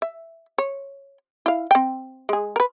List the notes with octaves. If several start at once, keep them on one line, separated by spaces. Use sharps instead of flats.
E5
C#5
E4 F5
C4 G5
G#3 G#4
A#4 B4